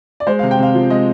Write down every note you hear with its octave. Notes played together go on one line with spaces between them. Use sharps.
D5
G#3 C5
C3 F5
G5
C3 F5
F3
G#3 D#5